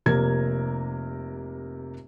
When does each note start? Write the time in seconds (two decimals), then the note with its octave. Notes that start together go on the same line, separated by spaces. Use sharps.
0.06 F1 C3 A#3 A#4 G#6